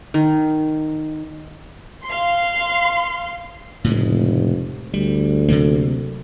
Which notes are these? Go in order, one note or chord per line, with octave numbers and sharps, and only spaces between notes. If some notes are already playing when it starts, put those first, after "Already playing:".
D#3
F5 C6
F1 A2 C#3 G#3
D2 G3
C3 F#3 A#3